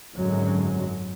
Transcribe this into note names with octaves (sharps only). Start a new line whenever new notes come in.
G#1 F#2 D3 F#3 G#3